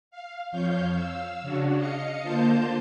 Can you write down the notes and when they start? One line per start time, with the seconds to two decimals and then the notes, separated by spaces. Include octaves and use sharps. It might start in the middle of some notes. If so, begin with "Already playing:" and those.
0.11 F5
0.51 F2 F3 C#5 F5 G6
0.92 F5 E6
1.42 C#3 C#4 D4 F#4
1.75 D#5 F5 C#7
2.22 D3 A#3 F4 C5 A5 G6